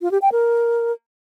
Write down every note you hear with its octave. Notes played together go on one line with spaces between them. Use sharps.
F4
G4
G5
A#4